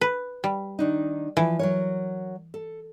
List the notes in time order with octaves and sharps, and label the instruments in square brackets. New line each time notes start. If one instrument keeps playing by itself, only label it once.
[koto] B4
G3
[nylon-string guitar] D#3 D4 D#4
[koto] E3 [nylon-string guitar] F3
[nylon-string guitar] F#3 A#4 C#5
A4